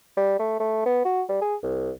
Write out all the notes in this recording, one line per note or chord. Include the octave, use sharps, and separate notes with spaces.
G3
A3
A3
B3
F#4
G3
G#4
C2